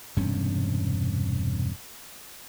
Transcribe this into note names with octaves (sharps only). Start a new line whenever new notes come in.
E1 G2 C3 C#4